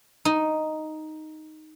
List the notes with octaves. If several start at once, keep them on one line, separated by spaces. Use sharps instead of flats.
D#4